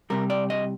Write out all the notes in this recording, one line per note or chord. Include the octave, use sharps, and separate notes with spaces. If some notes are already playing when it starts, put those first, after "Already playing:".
C2 C3 G3 A#4
D5
D#5